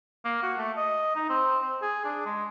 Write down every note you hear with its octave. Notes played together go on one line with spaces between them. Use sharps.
A#3
F#4
A3
D#5
D#4
C4
C4
G#4
D4
G#3